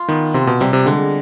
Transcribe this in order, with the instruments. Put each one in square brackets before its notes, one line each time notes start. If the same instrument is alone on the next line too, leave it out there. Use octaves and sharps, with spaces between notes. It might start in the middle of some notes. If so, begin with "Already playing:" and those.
Already playing: [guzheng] F4
[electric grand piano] D#3 [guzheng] B3
[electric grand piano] C3 [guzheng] C4
[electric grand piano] B2
[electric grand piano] C3 [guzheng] G3
[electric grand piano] C3
[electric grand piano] D3 [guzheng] G#3